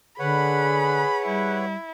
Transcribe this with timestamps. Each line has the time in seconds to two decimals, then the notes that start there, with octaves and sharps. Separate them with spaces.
0.19 D3 G#4 B4 C#5 F#5 B5
1.26 G3 E4